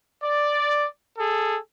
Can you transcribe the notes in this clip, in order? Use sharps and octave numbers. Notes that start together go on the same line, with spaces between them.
D5
G#4 A4